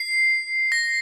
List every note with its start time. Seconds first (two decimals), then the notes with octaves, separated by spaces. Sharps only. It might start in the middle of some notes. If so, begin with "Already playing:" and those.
Already playing: C7
0.72 A#6